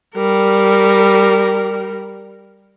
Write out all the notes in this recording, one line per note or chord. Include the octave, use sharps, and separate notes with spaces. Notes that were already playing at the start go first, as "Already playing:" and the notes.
G3 A#4